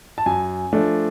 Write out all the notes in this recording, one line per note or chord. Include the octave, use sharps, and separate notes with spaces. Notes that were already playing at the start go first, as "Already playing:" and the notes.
A5
F#2 G#5
F3 A3 D4